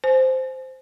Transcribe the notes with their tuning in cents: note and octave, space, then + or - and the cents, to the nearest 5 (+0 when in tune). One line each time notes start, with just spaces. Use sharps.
C5 -5 G#5 +35